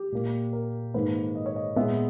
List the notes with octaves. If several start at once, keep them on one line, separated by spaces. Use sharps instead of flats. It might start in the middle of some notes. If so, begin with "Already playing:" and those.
Already playing: G4
A#2 A#3
A#4
G#2 D#3 A#3 B4
D#5
C#5
D#5
A#2 G#3 B3 E5